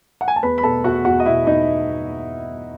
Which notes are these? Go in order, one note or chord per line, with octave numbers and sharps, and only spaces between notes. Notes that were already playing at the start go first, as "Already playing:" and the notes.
F#5
G#5
A5
E2 B4 B5
B5
B2 A4 A5
E2 F#4 F#5
E2 F#4 F#5
D#5
B2 E4 E5
E2 D#4 D#5